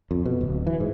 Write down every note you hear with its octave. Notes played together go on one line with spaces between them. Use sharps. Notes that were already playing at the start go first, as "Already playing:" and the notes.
F2
B2
D1
E3
G#2